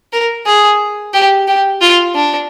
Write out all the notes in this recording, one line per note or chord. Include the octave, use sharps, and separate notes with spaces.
A#4
G#4
G4
G4
F4
D4